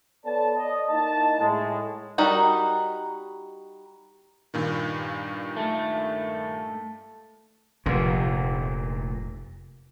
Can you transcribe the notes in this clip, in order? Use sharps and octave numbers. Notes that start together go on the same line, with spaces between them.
B3 A4 C#5 D5 A5
D5 D#5
A#3 D#4 E4 D#5 A5
A2 G#3
G3 D#4 F#4 A#4
G2 A#2 D#3
A3
F1 A#2